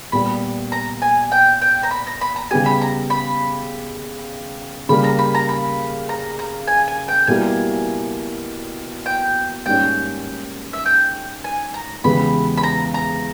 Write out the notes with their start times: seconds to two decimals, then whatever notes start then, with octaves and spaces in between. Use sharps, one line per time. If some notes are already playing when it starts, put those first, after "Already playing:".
0.12 A#2 G3 B3 G4 B5
0.72 A#5
1.02 G#5
1.32 G5
1.62 G5
1.83 A#5
1.91 B5
2.07 A#5
2.21 B5
2.36 A#5
2.51 C#3 G3 B3 G4 G#5
2.66 B5
2.81 A#5
3.10 B5
4.89 C#3 G3 A#3 B5
5.04 A#5
5.19 B5
5.35 A#5
5.49 B5
6.09 A#5
6.39 A#5
6.68 G#5
6.88 G#5
7.08 G5
7.27 B2 G3 A#3 E4 G4 G#5
9.06 G5
9.66 G#2 G3 A#3 C#4 G5
10.73 E5
10.86 G5
11.44 G#5
11.74 A#5
12.04 E2 C#3 G#3 B3 G4 B5
12.57 B5
12.63 A#5
12.94 A#5